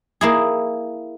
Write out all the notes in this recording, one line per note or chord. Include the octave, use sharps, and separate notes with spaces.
A#3 E4 G#4